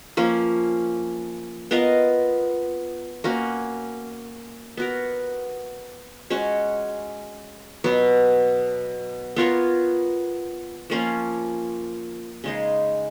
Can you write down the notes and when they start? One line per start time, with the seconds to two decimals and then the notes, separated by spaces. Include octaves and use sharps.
0.17 F3 A#3 C#4
1.71 B3 F4 A#4 D#5
3.24 A#3 C#4 F#4
4.77 B3 F#4 A#4
6.30 G#3 C#4 F#4 C#5
7.84 B2 F#3 B3
9.36 B3 F4 A#4 C#5
10.90 F3 A#3 C#4 F4
12.44 C#3 G#3 D#4